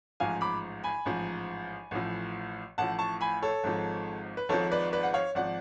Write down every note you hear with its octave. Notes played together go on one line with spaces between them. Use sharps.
A1 G#2 F3 F5 G#5
B5 D6
G#5 B5
A1 G#2 F3
A1 A2 F3
A1 A2 F3 F#5 A5
A5 C#6
G#5 B5
A4 C#5
G#1 G#2 F3
B4
G#1 G#2 F3 A4 C#5
B4 D5
B4 D5
F#5
C#5 F5
G#1 F3 D5 F#5